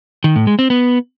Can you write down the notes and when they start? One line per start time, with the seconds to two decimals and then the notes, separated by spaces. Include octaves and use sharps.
0.24 D#3
0.36 A2
0.47 G#3
0.59 C4
0.70 B3